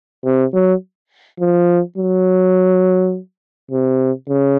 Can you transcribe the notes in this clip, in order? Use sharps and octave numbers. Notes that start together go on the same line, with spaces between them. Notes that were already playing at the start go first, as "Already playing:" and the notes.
C3
F#3
F3
F#3
C3
C#3